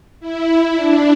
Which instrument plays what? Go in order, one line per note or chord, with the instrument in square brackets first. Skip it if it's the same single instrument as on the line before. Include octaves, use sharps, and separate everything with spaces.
[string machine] E4
D4